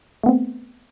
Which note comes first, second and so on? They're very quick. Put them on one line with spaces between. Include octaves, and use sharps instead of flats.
A3 B3 C4